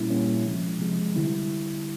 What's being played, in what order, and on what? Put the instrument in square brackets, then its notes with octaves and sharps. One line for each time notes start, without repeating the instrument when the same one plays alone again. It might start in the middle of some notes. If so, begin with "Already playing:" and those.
Already playing: [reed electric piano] A#2 G3 A#3 C#4 E4
A#2 G3 A#3 C#4 E4
C3 F3 G#3
C3 F3 G#3
D3 G3 B3 E4